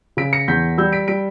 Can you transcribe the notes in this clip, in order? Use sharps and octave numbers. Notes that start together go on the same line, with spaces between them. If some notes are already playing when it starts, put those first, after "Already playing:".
C#3 B6 D7
A#6 C#7
E2 G6 B6
G3 E6 G6
B6 D7
G3 B6 D7